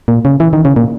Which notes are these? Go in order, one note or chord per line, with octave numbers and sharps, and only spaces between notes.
A#2
C#3
E3
D#3
C#3
A#2